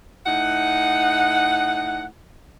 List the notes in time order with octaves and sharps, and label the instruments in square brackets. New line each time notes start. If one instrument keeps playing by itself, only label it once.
[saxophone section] A2 D#4 F#5